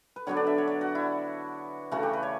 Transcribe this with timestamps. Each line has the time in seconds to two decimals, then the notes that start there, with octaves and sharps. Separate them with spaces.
0.16 B4
0.27 D3 F#3 B3 D4 C#5
0.37 D5
0.47 E5
0.58 C#5
0.68 D5
0.81 F#4
0.95 E4
1.91 C#3 E3 A3 F#4
2.03 G4
2.13 B4
2.23 C#5